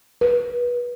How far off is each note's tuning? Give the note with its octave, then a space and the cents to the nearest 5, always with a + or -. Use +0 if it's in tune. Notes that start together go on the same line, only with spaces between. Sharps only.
B4 -25